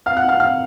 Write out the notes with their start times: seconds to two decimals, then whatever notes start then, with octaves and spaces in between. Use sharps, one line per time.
0.06 F5 F6
0.17 F#5 F#6
0.29 F5 F6
0.40 F5 F6